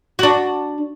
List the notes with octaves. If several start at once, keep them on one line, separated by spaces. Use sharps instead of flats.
D4 F#4